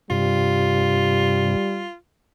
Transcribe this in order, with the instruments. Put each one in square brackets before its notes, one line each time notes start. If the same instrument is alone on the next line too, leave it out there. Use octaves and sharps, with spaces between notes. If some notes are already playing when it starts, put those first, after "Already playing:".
[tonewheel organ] G2 C3 [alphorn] G3 [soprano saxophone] F4